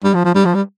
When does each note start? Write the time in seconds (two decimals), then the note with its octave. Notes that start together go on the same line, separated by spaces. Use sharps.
0.04 G3
0.15 F3
0.25 F3
0.35 G3
0.45 F3
0.55 G3